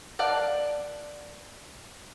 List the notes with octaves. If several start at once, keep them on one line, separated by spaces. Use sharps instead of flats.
A#4 D5 F5 F#5 A5